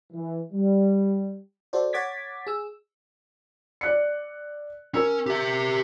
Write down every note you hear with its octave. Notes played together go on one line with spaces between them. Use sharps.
E3
G3
F#4 A4 C5 D5
C#5 F#5 D6 G#6 A6 B6
G#4 E6
D5 F#6 C#7
C#4 A#4 E6
G4 E5